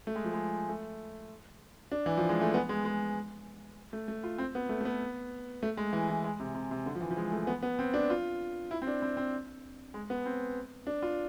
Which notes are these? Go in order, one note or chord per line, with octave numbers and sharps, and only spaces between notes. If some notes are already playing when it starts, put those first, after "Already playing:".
A3
G#3
F3
G#3
A3
D4
E3
F3
G#3
A3
B3
G#3
G#3
A3
A3
F4
C4
B3
A3
A3
B3
A3
G#3
E3
E3
G#3
C3
C3
C3
D3
F3
E3
F3
G#3
A3
B3
B3
C4
D4
F4
E4
C4
D4
C4
C4
G#3
B3
C4
D4
F4